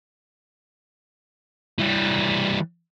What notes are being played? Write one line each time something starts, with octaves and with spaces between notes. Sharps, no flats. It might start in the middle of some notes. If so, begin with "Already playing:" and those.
E3 G3